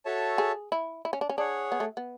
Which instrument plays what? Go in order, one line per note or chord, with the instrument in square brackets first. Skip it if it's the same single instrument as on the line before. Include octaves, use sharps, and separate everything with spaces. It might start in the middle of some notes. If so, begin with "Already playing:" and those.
[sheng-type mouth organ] F#4 A4 C#5 E5 A5
[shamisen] G#4
E4
E4
C#4
D4
C#4
[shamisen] D4 [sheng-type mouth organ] G#4 C#5 F#5
[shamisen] B3
A3
B3